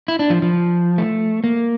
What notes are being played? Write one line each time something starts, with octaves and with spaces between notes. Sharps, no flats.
E4
D4
F3
F3
A3
A#3